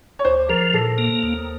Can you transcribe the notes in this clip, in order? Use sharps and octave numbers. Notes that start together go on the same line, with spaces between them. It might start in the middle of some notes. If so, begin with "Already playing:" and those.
C#5
D2 C5
F3 A#4
A#2 A4
A#3
D#2